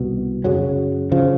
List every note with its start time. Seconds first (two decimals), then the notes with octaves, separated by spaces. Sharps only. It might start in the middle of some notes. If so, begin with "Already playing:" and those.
Already playing: C2 B2
0.44 F#2 C#3 F#3
1.12 C#3 F3